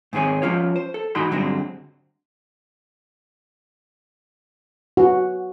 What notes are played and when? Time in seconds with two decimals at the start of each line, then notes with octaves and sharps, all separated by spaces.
0.13 G#2 D#3 C4 G#4 C#5
0.42 F3 C#4 F4 C#5
0.76 C5
0.94 A4
1.15 G#2 E3 D#4 F#4 B5 C6
1.31 G2 D3 F#3 G#3 C4
4.97 F#4